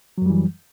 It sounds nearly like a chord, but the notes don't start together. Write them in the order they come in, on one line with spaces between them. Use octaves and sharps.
F#3 F#2 G3 E3